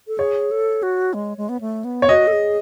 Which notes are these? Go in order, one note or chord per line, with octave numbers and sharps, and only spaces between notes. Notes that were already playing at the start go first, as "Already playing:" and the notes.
A4
G#4 C#5
A4
F#4
G#3
G#3
B3
A3
B3
C#5
F#4 D#5
A4
G#4